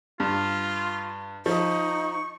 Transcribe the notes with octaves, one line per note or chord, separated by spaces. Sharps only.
G2 F4
F3 D#4 C#6